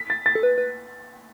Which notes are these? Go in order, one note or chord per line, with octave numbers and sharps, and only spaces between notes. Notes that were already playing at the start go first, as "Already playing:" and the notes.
Already playing: B6
A6
A6
A4
B4
B4